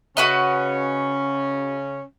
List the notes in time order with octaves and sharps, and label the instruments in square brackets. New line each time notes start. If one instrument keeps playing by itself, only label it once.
[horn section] C#3 C#4 [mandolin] F#4 B4 D#5